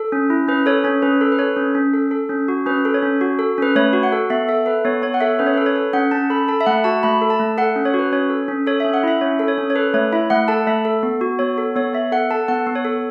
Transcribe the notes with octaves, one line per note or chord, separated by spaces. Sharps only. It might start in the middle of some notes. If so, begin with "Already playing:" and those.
Already playing: A4
C#4
E4
C#4 B4
A4 C#5
C#4 C#5
C#4 B4
A4
B4
A4 C#5
C#4
C#4
A4
A4
C#4
F#4
C#4 B4
A4
C#5
C#4
F#4
A4
C#4 B4
A3 C#5
F#4
F#5
A4
B3 E5
A4 E5
A4 B4
B3 C#5
B3 C#5
F#5
A4 E5
C#4 B4
C#5
B4
A4
C#5
A4
C#4 F#5
C#4 A5
A4 B5
A4 A5
E5
A3 F#5
F#4 A5
A3 B5
A4
A5
A3
A4 F#5
C#4
C#5
F#4 B4
C#4 C#5
A4
C#4
A4 C#5
E5
C#4
F#5
E4 E5
C#4 C#5
A4
C#5
C#4
C#5
A4 B4
A3 C#5
E4 E5
A3 F#5
A4 A5
A3 E5
A4
B3
F#4
B3 C#5
A4
B3 C#5
B3 E5
A4 F#5
A4 A5
B3 F#5
B3
C#5
A4